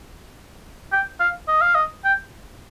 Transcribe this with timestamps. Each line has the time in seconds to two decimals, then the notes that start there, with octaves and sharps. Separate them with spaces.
0.93 G5
1.20 F5
1.48 D#5
1.62 F5
1.75 D#5
2.05 G5